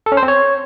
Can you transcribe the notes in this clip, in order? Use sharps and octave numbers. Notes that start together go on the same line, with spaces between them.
A4
C#4
C5
C4
C#5